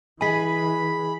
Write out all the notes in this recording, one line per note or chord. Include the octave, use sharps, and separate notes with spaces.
E3 G#4 D#5 G#5 B5 B6